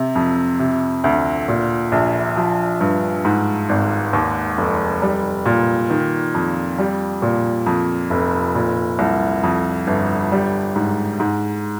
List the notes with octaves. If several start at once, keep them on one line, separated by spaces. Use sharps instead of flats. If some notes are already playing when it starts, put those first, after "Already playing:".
Already playing: C3
F2
C3
D2
A#2
A#1
F3
G2
G#2
G#1
D#2
F1
G3
A#2
D#3
F2
G3
A#2
F2
F1
A#2
C2
F2
G1
G3
G#2
G#2